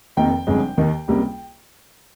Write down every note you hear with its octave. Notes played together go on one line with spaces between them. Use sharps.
F1 F2 D#3 A#3 G5
G1 F2 C#3 G#3
D#2 D#3 A#3
C#2 C3 G3 A#3